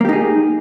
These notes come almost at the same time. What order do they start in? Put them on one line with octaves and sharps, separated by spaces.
A#3 G4 D#4 G#4